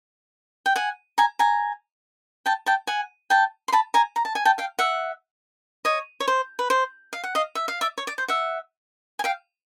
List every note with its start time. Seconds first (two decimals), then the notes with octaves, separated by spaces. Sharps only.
0.66 G5
0.76 F#5 G#5
1.18 G#5 A#5
1.39 G#5 A#5
2.46 G5 A5
2.66 G5 A5
2.87 F#5 G#5
3.30 G5 A5
3.68 C6
3.72 A5 B5
3.94 G#5 A#5
4.16 A#5
4.25 A5
4.35 G#5
4.45 G5 A5
4.58 F5 G5
4.79 E5 F#5
5.85 C#5 D#5
6.20 C#5
6.28 C5
6.59 B4
6.70 C5
7.13 F5
7.24 F#5
7.35 D#5 F5
7.55 E5
7.68 F5
7.81 D5 E5
7.98 C#5
8.07 D5
8.18 C5
8.28 E5 F#5
9.19 G#5
9.24 F5 G5